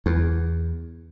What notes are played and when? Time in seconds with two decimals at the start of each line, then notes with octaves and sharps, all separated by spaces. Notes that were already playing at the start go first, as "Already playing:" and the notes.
0.06 E2